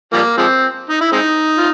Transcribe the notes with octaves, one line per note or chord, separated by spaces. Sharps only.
F3 G3 A#3
F3 G#3 C4
D#4
E4
G#3 C4 D#4
F4